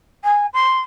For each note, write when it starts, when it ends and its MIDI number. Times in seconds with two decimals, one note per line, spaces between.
0.24 0.46 80
0.53 0.80 84